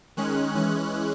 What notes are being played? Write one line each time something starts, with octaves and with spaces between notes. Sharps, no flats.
D#3 G#3 C#4 F#6
E3 G#3 C#4 F#6